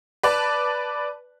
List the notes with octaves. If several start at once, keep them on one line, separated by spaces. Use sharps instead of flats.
B4 D5 A5